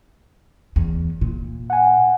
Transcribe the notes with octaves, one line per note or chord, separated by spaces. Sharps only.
E2
A#2
F#5 G#5